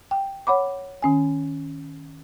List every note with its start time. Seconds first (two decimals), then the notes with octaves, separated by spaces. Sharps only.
0.11 G5
0.47 C#5 F#5 B5 D6
1.02 D#3 C#4 G#5